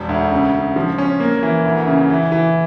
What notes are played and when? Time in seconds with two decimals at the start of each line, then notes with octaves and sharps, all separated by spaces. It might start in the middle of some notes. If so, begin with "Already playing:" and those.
Already playing: E1
0.09 D2
0.31 C#3
0.54 C#3
0.76 F3
0.98 C#4
1.20 A#3
1.43 E3
1.65 D2
1.87 C#3
2.10 E3
2.32 E3